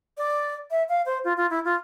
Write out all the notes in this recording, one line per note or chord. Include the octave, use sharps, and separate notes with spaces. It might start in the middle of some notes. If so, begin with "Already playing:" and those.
D5
E5
F5
C5
F4
F4
E4
F4